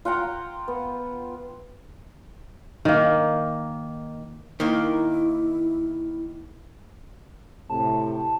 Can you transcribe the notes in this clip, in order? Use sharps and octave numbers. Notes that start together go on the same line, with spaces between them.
F4 F#5 G5 A#5
B3
D#3 A#3
D#3 A#3 E4
A2 C3 A5